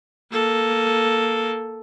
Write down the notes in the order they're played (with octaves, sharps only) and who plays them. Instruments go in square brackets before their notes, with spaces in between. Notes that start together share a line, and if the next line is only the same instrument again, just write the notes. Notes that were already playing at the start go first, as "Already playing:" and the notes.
[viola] A#3 A4